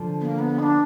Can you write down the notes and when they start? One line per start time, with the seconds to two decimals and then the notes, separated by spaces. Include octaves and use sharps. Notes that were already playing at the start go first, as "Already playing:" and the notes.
Already playing: D3 F3
0.21 B3
0.25 A#3
0.39 B3
0.59 D#4
0.63 D4